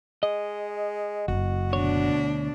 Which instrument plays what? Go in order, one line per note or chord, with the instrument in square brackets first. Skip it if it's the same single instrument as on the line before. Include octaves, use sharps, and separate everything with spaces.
[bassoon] G#3 [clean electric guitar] D#5
[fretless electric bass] F#1 [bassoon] F#4
[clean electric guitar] D2 C#5 [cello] B2 D4